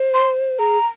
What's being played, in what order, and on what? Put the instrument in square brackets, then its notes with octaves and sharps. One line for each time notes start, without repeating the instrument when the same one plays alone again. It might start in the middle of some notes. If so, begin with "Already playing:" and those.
Already playing: [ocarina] C5
[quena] C6
[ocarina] G#4 [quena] A#5